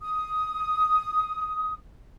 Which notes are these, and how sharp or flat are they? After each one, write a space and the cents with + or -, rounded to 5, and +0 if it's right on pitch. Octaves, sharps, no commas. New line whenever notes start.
D#6 +10